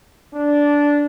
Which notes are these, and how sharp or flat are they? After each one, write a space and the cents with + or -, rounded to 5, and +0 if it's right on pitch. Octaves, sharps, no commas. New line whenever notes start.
D4 -10